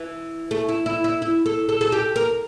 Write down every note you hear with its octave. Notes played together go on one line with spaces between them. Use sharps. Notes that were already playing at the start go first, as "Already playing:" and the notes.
Already playing: E3
A3
E4
E4
E4
E4
A4
A4
A4
G4
A#4